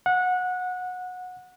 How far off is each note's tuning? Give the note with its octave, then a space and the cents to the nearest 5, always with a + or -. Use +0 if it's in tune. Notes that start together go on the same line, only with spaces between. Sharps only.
F#5 -20